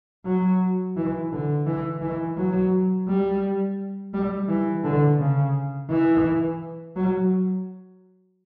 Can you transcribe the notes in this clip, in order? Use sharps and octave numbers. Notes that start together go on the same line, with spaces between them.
F#3
E3
D3
E3
E3
F#3
G3
G3
E3
D3
C#3
E3
F#3